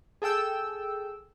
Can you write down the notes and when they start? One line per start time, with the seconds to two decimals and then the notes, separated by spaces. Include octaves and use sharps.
0.22 G#4 A4 G5 E6 G6